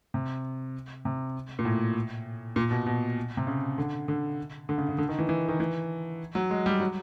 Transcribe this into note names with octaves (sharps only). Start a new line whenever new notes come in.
C3
C3
A#2
A2
A#2
B2
B2
C3
C#3
D3
D3
D3
C#3
C#3
D3
D#3
E3
E3
D#3
E3
F#3
G#3
G3
F#3